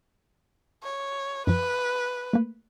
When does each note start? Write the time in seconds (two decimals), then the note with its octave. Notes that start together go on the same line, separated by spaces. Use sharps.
0.83 C#5
1.47 F#2 F3 B4
2.33 A3 A#3